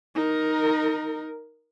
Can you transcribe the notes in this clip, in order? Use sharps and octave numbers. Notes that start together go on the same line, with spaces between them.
D#4 A#4